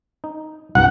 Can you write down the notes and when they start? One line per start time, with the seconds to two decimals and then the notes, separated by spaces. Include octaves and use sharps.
0.24 D#4
0.75 C2 G2 F#5